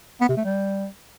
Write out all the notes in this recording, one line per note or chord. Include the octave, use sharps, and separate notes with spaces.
B3
C3
A3
G3